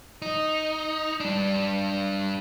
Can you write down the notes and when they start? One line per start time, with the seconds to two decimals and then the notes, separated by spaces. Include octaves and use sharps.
0.22 D#4
1.20 G2 D4